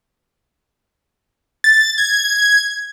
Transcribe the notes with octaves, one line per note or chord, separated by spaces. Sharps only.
A6
G#6